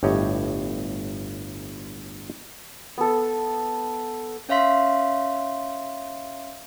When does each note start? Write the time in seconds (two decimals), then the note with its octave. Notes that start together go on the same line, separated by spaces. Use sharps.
0.03 G1 A2 G4 C#5 D#5
2.98 B3 A4
4.49 C#4 C#5 E5 F5 C6 B6